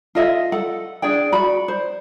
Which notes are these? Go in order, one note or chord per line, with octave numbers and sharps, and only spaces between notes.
F4 A4 D#5 E5
A4 F#5
D4 G#4 D5 G5
F#4 D5 B5
C5